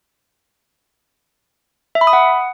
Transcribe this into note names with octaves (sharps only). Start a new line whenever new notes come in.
E5
B5
D#6
F#5